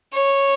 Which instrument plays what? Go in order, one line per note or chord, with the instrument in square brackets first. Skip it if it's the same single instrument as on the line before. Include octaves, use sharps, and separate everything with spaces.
[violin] C#5